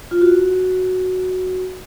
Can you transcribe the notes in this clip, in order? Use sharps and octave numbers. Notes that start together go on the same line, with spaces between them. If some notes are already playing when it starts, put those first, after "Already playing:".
F4
F#4